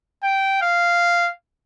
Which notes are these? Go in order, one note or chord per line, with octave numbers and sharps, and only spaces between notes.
G5
F5